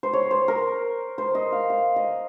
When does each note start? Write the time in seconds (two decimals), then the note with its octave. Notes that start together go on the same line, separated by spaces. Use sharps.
0.03 C5
0.13 C#5
0.31 C5
0.48 A#4
1.18 C5
1.35 D#5
1.52 F5
1.70 F5
1.96 D#5